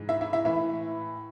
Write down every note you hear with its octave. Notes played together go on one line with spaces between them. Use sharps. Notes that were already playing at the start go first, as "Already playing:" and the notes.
Already playing: G#2 E3
E4 E5
E4 E5
E4 E5
A2 E3 E4 E5